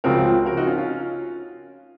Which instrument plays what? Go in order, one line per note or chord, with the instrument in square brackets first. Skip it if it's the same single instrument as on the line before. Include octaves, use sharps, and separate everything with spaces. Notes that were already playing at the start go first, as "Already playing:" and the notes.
[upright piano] C#2 C#3 F3 C4 [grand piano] F#4 A#4
[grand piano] F#4 A#4
D#4 F#4
C#4 F4
C#4 F4